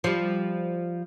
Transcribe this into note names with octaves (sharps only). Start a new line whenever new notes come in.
F3 G3